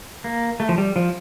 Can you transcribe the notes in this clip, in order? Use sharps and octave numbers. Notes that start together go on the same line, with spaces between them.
A#3
A3
F3
G3
F3